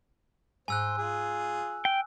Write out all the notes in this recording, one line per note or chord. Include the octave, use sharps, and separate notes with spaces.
G#2 C5 G#5 E6 F#6
F4 G#4
G5